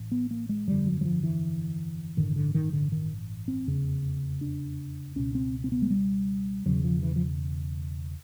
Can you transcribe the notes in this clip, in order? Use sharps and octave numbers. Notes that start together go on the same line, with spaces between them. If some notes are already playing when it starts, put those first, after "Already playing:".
Already playing: A1 A2
B3
A#3
G#3
G1 F2 D3 G3
F#3
F#3
F3
E3
A1 G2 D3 D#3
D3
D#3
D3
D#3
C4
F1 E2 C#3
D4
C#2 B2 C#4
C4
C4
B3
G#3
G3
E1 E2 C#3 F#3
F3
E3
F3